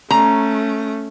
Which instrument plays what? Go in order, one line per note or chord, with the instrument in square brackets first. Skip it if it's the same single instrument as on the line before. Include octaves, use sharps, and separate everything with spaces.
[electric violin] A3 C#4 [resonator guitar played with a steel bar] A#5